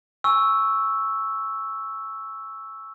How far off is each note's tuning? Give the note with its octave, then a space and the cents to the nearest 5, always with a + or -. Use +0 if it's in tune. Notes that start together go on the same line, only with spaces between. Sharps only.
G#5 +0 C#6 +0 E6 +0